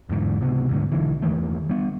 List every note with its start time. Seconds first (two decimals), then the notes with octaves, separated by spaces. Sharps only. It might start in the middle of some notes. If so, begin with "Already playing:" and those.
0.09 E2 G#2 D3
0.41 C#2 C3 B3
0.69 D2 G#2 D3
0.92 B1 D3 E3
1.22 E2 D#3 E3 A3
1.69 G3 B3